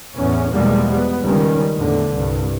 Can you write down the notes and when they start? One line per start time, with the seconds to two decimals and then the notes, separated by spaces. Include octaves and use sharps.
0.16 E2 A2 C#4
0.53 E2 B2 F3 G3 G#3 A#3
0.92 B3
1.23 C#2 D#3 G3 C#4
1.75 E2 A2 D3
2.11 C2 G2